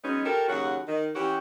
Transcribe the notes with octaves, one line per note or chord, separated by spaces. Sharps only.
F#3 G#3 B3 C#4 D#4
F#4 G4 A4 A#4
D#2 C#3 F#3 F#4 F#5
D#3
E3 C#4 F#4 G4